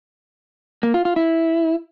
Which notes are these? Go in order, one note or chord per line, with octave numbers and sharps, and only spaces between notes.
A#3
F4
F4
E4